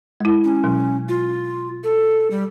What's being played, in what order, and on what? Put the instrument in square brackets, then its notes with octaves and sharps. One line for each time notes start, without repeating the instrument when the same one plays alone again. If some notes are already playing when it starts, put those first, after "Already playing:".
[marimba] G#3 E4
[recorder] C#4
[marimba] B2 F#3
[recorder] F4
A4
G3